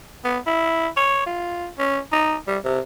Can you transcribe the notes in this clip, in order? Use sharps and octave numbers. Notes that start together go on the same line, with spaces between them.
B3
E4
C#5
F4
C#4
D#4
G3
C3